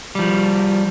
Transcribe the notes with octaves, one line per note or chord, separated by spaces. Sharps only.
F3 G3